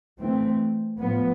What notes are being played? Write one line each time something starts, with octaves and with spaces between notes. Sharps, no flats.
E3 A3 C4
A2 F3 B3